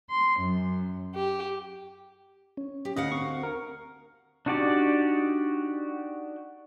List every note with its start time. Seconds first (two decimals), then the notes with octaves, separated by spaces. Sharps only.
0.10 C6
0.40 F#2
1.14 G4
2.57 C#4
2.85 G4
2.96 D2 D#5 F5 F#5
3.12 C4 C#6
3.43 A#4
4.46 D4 D#4 F#4 G4 D5